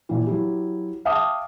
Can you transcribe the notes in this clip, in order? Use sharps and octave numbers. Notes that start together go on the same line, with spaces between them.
A#2 E3
F#3 E4 G4
E5 F5 G5 A5 D6 D#6